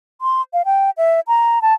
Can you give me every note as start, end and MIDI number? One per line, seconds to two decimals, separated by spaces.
0.21 0.42 84
0.53 0.62 77
0.65 0.90 79
0.97 1.20 76
1.28 1.62 82
1.62 1.74 81